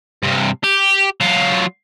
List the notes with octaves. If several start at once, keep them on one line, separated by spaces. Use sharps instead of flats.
G2 C3
G4
F#3 F4